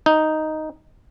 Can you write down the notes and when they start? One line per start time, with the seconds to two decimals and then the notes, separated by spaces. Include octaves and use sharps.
0.06 D#4